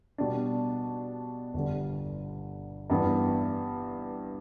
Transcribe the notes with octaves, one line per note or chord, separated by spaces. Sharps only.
B2 G3 D4
G1 G2 D3 G3
G2 E3 B3